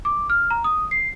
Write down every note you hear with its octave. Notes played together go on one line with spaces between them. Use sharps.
D6
F6
A#5
D#6
C7